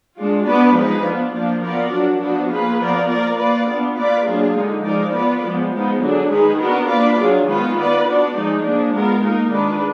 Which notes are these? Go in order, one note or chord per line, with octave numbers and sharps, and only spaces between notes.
G#3 D4 F4
B3 D4 F#4 B4 D5
F3 G#3 D#4 G#4 B4
B3 D4 F4
F3 A#3 D4 F4
B3 F4 A#4 D5
F#3 D4 F#4
F3 B3 D4 F#4
A#3 F4 G#4 B4
F3 B3 F4 A#4 D5
A#3 F4 A#4 D5
A#3 F4 B4 D5
B3 D4 F4
A#3 F4 B4 D5
F#3 A#3 D4 F4 G#4
D3 G#3 D#4
F3 G#3 D#4 A#4 D5
B3 F4 B4 D5
F3 G#3 B3
F3 G#3 B3 D#4
D3 F#3 D4 G#4
D#3 G#3 D#4 G#4 B4
B3 D4 F#4 A#4
A#3 D4 F4 B4 D5
F#3 D4 F4 G#4
D#3 G#3 B3 F4 B4
B3 F4 B4 D5
B3 D4 F#4 D5
F3 G#3 D#4 G#4
F3 A#3 D4 G#4
G#3 B3 F4 A#4
A#3 D#4 A#4
D#3 G#3 D4 F4 B4